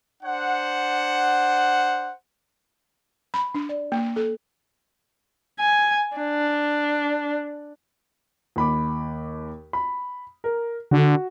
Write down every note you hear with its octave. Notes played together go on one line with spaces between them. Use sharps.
D4 C5 F#5
B5
D4
D5
A#3
A4
G#5
D4
D#2 B5 D6
B5
A#4
D3 F#4